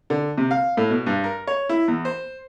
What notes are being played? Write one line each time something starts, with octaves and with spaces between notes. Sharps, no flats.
D3
C3
F5
A2
B2
G2
A#4
C#5
E4
E2
C5